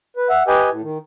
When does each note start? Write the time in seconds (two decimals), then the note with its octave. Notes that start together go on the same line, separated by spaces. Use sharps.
0.17 B4
0.29 E5 F#5
0.47 G4 B4 D#5 G5 G#5
0.70 A2
0.82 D#3